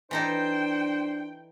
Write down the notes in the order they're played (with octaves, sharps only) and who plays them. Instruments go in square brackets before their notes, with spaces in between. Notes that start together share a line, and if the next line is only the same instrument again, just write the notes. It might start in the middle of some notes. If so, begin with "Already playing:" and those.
[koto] E3 D#4 A4 [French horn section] D4 [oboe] C5 [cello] G5